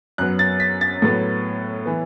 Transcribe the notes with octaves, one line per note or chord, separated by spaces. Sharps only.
F#2 F#3 B3 F#6
A6
B6
A6
A2 F#3 B3
E3 B3